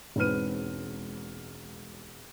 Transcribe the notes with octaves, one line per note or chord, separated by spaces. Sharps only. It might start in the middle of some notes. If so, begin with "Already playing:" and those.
E1 G#2 C4 B4 F6 D#7